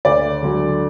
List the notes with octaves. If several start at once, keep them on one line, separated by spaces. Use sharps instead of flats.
D2 D5
D3 F#3